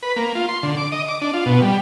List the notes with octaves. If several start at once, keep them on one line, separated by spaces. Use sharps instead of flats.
B4
A#3
F4
C6
D3
D6
D#5
D6
D4
F4
B2
G3